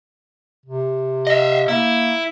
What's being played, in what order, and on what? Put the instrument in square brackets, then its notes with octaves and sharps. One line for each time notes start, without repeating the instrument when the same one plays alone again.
[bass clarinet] C3
[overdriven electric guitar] D#5 E5
[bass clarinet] A#3 [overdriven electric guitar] E4